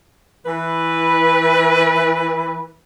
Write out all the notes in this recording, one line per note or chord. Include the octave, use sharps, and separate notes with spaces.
E3 B4